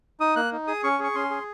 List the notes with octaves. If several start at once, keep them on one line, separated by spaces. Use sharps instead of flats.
D#4 D#6
A#3 F#6
D#4
G#4 D#6
C#4 C#6
G#4 C#6
C#4 C6
G#4